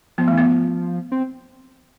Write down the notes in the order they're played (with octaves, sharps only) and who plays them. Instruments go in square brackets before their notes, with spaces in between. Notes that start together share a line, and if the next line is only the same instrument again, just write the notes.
[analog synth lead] F3 [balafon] B3
[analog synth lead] E3 [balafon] A3
[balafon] B3
[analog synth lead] F3
C4